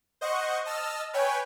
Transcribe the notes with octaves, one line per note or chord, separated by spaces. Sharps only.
C5 D#5 F#5 C#6
D#5 A5 E6 F6
B4 C#5 G5 G#5